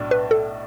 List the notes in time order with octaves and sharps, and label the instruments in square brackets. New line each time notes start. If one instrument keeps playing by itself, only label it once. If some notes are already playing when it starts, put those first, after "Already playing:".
Already playing: [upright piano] B1 A2 D4
[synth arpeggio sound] B4
A4